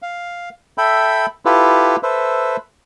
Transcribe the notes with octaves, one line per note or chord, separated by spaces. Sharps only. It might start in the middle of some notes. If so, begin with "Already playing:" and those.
F5
A4 E5 G5 B5
E4 F4 G4 A4 B4
A4 B4 C5 E5